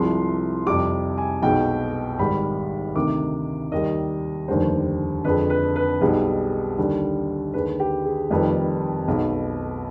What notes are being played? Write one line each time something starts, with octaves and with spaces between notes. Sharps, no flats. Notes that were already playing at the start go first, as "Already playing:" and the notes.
Already playing: C2 C3 F3 G#3 C6
F2 C3 G3 D6
G#5
B1 B2 G#3 G5
G#1 G#2 G3 B5
D2 C3 D#3 D6
D#2 D#3 G3 D#5
F1 D#2 D3 G3 C5
F2 D3 G#3 B4
B4
B4
B1 B2 G3 G#4
D#2 D3 G3
D#2 D3 G#3 B4
G4
G#4
F1 F2 D#3 G3 B4
B1 B2 G#3